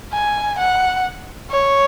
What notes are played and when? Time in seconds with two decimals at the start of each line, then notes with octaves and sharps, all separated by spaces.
0.13 G#5
0.59 F#5
1.51 C#5